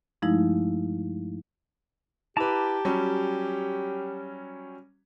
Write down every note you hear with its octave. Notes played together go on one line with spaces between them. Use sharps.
G2 F3 G#3 A3 D#4 E4
E4 G4 B4 A5 A#5 D6
F#3 G3 C#4